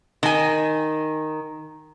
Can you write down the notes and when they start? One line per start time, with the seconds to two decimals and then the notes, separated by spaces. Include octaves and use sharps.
0.23 D#3 G#5